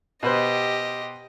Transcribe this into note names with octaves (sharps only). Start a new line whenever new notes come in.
B2 G4 B4 C5 D#5